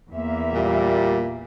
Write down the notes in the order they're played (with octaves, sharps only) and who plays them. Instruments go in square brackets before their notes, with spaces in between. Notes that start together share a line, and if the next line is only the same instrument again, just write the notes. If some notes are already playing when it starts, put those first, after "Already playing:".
[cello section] E2 A#3 E5
[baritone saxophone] A#2 [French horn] G3